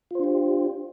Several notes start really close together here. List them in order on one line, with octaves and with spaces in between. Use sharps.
F4 C5 D4 G4